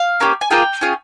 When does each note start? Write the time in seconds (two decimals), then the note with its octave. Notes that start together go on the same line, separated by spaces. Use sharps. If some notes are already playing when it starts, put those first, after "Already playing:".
Already playing: F5
0.20 A#3 C#4 G4
0.41 G#5
0.51 A#3 F4 G#4 G5
0.81 C#4 F4 G#4